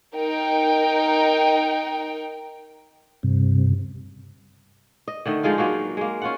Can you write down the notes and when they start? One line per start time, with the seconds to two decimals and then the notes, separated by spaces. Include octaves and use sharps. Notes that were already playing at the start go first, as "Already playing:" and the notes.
0.16 D#4 A#4 G5
3.23 G2 C3
5.08 D#5
5.26 D3 D#3 A3 D#5
5.43 F3 G#3 D#4 F4
5.58 F#3 A#3 D#4 F#4
5.97 G#3 A#3
6.22 C#4 F4 F#5